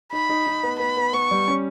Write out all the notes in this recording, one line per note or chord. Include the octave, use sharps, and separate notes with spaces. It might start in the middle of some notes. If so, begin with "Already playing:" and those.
D#4 B5
D#4
D#4
B3
B3 B5
B3
B3 C#6
G3
C#4